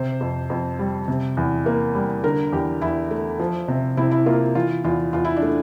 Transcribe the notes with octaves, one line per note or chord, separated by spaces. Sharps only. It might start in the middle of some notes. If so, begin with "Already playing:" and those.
Already playing: C3 C5
F2
F2
G3
C3
E2
A#3
G3
D3 A#4
E2 G4
E2 E4
A3
F3
C3
C3 E4
E4
A#3 F4
E3 F4
E2 F4
E2 F4
E4
D4
A3